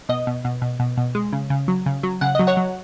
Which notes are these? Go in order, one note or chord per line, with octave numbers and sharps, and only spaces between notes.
B2 D#5
B2
B2
B2
B2
B2
G#3
C#3
C#3
F#3
C#3
F#3
C#3 F#5
F#3 D#5
C#5 F#5
F#3